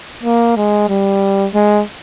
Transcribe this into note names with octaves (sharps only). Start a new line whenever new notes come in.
A#3
G#3
G3
G#3